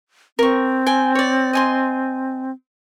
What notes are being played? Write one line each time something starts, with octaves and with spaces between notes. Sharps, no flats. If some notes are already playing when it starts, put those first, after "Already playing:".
C4 A#4 C#6
G5 G#5
C#5 D5
D#5 G#5 C6